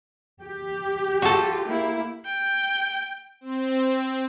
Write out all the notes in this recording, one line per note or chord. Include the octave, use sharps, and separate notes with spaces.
G4
F4 F#4 A4
A#3 E4
G5
C4